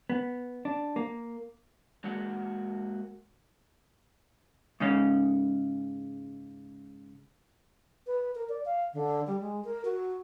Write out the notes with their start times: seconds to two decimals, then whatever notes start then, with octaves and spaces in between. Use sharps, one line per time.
0.10 B3
0.65 D4
0.96 A#3
2.04 G#3 A#3 F#4 F#5
4.80 G#2 C#3 C#4
8.07 B4
8.35 A#4
8.49 D5
8.65 F5
8.94 D3
9.27 G3
9.41 G#3
9.64 A#4
9.85 F#4